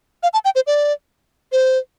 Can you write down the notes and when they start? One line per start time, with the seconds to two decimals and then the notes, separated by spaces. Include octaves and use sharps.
0.23 F5
0.33 A5
0.45 G5
0.55 C5
0.67 D5
1.52 C5